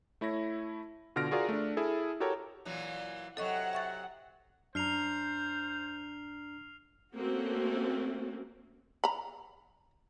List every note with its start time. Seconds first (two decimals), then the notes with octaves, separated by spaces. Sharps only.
0.21 A3 E4 C#5 A#6
1.16 B2 D3 F4 F6 A#6 D7
1.31 F4 F#4 G#4 A#4 D5 F5
1.49 A3 D4
1.77 E4 G#4 A4
2.20 F#4 G4 A4 A#4 C#5
2.65 A#2 E3 F#3
3.37 C3 F#3 A4 D#5 F#5 C#6
3.73 E5 C#6 A6
4.75 F#2 D4 C5 A#5 F6 C7 F7
7.16 A3 A#3 C4 C#4 F#4
9.04 A#5 B5